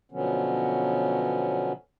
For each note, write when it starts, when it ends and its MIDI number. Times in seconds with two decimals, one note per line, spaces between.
0.12 1.73 47
0.12 1.73 50
0.12 1.73 53
0.12 1.73 54
0.12 1.73 59
0.12 1.73 61